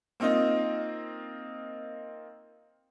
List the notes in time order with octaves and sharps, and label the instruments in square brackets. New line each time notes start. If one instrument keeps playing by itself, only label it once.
[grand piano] A#3 C4 D#4 F4 D#5